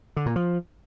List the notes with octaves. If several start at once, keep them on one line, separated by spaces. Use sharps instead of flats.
D3
A#2
F3